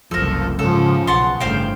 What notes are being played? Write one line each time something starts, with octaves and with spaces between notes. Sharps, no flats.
F#1 C2 F3 A4 A#4
G#2 C#3 F3 A4
B1 F#5 A5 C6
G1 A2 C5 F5 G5